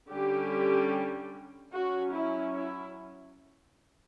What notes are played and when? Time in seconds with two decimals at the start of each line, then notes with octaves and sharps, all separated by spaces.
0.10 D3 G3 C#4 G4
1.74 F#3 C#4 F#4
2.14 E4
2.55 E4